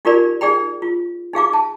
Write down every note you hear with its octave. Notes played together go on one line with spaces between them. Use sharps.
D#4 F4 G4 A#4 D5 B5
D#4 G#4 D5 G5 B5
F4
D#4 G#4 F5 D6
A5